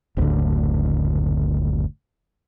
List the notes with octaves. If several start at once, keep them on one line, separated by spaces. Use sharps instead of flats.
F#1 D2 A2 D3